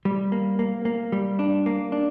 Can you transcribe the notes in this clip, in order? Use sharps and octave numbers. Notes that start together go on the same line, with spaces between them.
G3
A#3
A#3
A#3
G3
D4
A#3
D4